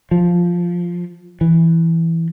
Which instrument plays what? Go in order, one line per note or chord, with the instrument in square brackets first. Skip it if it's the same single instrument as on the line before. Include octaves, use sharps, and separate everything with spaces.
[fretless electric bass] F3
E3